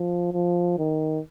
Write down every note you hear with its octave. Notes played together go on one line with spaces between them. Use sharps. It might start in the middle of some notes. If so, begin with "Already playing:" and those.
Already playing: F3
F3
D#3